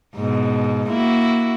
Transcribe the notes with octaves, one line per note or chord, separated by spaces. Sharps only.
G#2 B2
A#3 E4 F#4